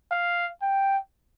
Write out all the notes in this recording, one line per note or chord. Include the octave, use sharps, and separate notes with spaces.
F5
G5